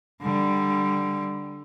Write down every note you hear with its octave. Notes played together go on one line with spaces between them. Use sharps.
D3 G3